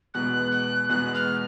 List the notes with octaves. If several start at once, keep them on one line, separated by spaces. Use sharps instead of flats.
E2 B2 G#3 B3 F#6
F#6
E2 B2 G#3 B3 F#6
F6